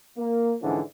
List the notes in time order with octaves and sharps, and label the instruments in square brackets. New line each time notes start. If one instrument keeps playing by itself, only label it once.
[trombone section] A#3
G#2 D3 E3 F3 C#4